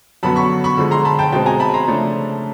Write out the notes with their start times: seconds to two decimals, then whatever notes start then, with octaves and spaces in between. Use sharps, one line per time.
0.23 F#2 D3 F#3 B3 A5 B5
0.36 B5 C#6
0.64 B5 C#6
0.78 D3 F3 G#3
0.91 A#5 C6
1.05 A5 B5
1.19 G5 A5
1.32 B2 G#3 C4 G5 A5
1.46 G#5 A#5
1.60 A5 B5
1.74 A#5 C6
1.87 C#3 F3 A3 D4